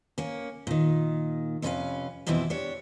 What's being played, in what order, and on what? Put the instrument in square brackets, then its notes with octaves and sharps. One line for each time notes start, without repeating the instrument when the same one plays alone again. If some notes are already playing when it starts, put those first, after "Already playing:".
[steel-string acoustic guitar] A#3 C#4
A#2 D#3
F2 C3 C#4 D4 B4 F5
F2 B2 E3 C4 E4
D4 G4 C#5